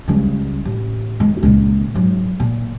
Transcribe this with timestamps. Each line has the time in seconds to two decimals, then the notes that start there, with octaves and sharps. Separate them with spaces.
0.08 C#2 G3
0.65 A1
1.20 D#3 G#3
1.43 C#2 A#2
1.94 G#2 F#3
2.40 A#2